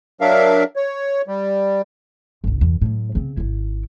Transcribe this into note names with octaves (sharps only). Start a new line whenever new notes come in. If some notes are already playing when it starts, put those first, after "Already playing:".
F#3 D4 A#4 E5 F5
C#5
G3
G1 C2
E2
A2 F#3
C#3 C4
G#1 E4